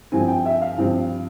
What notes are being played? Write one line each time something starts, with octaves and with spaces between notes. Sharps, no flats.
G2 F3 C4 G#5
G5
E5
F5
G2 F3 C4